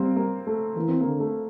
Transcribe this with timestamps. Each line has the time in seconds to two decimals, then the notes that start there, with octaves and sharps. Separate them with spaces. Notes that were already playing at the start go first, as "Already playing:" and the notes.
Already playing: G3 A#3 C4
0.16 A#3
0.47 A3
0.75 E3 A#3
0.88 C4
1.01 D3 A#3
1.20 A3